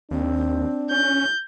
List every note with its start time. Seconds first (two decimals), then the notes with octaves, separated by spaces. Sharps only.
0.11 D#2 C4 D4
0.91 C#4 G6